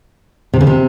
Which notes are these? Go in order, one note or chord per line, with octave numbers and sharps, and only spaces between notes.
C3
C#3
C3